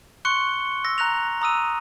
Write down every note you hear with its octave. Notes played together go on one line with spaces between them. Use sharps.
C6 C#6 F#6 C#7 G7
E6 A#6
A#5 F#6 A#6 F7
A#5 D#6 E6 D#7